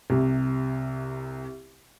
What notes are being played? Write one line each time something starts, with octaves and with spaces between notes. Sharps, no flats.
C2 C3